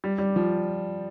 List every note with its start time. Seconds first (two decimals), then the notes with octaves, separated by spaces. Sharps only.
0.04 G3
0.18 G3
0.36 F3